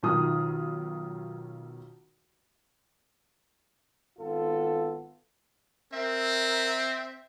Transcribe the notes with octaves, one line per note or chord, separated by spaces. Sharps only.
B1 D#3 F4 D#6
G#1 B3 F4 A4
C4 A#4 E5